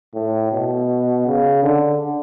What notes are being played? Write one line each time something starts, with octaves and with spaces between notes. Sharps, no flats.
A2
B2
C#3
D3